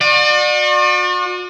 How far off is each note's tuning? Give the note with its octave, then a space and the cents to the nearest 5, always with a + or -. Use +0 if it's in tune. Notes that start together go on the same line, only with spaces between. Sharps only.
F#4 -40 D5 +30